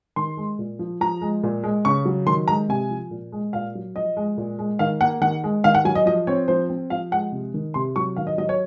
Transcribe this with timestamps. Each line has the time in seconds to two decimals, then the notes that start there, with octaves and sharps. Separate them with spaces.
0.16 D#3 C6
0.37 G#3
0.59 A#2
0.79 F3
1.01 F3 A#5
1.21 G#3
1.43 A#2
1.64 G#3
1.85 C#3 C#6
2.05 F#3
2.26 D#3 C6
2.48 G#3 A#5
2.69 C3 G#5
2.90 F3
3.11 A#2
3.32 G#3
3.53 A#2 F5
3.75 F#3
3.96 F3 D#5
4.17 G#3
4.37 A#2
4.59 G#3
4.79 D#3 F5
5.01 A#3 F#5
5.21 D#3 F#5
5.44 G#3
5.64 D#3 F5
5.75 F#5
5.85 F#3 G#5
5.95 D#5
6.06 F3 D#5
6.27 C4 C#5
6.48 F3 C5
6.70 C4
6.90 F3 F5
7.11 G#3 F#5
7.32 C3
7.54 D#3
7.74 C3 C6
7.96 F#3 C#6
8.16 D#3 F5
8.27 D#5
8.38 F#3 D#5
8.49 C#5